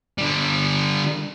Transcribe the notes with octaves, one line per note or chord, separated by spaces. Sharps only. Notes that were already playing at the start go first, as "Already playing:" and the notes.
D3 G3